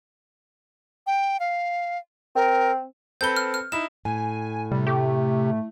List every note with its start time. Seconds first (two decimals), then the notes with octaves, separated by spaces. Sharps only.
1.07 G5
1.40 F5
2.36 C4 A#4
3.21 C4 A4 B4 G6 G7
3.36 F6
3.54 F6
3.72 D#4 E4 E7
4.05 A2 G#5
4.71 C3 G3
4.87 A3 G4